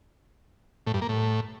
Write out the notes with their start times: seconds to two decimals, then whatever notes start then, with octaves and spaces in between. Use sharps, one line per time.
0.87 A2
0.94 G2
1.02 A#3
1.09 A2